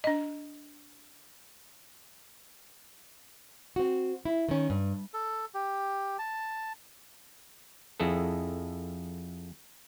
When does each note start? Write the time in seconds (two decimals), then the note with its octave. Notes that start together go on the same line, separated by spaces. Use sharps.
0.04 D4 D#5
3.76 C4 F#4
4.25 E4
4.49 D#3 C#4
4.70 G2
5.14 A4
5.54 G4
6.19 A5
8.00 F2 E4 G#4 A4